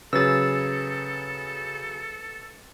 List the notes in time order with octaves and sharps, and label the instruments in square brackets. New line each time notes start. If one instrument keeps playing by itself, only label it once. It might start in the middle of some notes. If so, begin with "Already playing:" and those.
[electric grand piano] C#3 F#3 G#4 [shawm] A4 [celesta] B4 [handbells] E6 A6